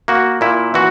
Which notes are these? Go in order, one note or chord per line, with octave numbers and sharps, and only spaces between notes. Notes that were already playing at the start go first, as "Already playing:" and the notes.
A#3 F#4
A#2 E4
E3 F#4